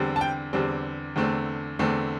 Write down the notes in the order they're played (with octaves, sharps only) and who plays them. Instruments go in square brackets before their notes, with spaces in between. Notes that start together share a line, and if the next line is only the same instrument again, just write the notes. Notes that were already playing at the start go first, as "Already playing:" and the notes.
Already playing: [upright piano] E2 D3 G3 C4
A5
G5
E2 D3 G3 C4
E2 D3 A3 C4
E2 D3 A3 C4